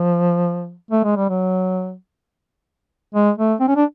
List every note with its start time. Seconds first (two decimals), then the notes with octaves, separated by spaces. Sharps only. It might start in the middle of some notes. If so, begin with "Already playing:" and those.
Already playing: F3
0.91 A3
1.04 G#3
1.17 G3
1.29 F#3
3.14 G#3
3.38 A3
3.60 C4
3.68 C#4
3.76 D4